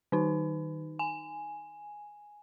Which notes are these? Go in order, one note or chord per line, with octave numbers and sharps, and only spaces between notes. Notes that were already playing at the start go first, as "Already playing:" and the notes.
D#3 D#4
G#5